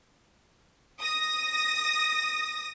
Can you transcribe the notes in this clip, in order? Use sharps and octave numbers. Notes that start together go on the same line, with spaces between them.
D#6 A#6